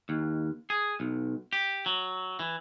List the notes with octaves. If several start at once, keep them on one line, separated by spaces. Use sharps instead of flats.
D#2
G#4
B1
G4
F#3
E3